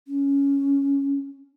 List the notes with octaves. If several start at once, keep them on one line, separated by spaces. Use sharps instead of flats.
C#4